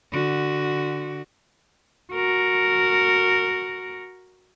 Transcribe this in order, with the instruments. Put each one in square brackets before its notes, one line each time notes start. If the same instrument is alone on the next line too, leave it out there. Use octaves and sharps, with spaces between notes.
[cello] D3 F#4
F#4 A#4